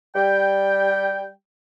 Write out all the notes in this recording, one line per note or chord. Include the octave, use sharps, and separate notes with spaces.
G3 G5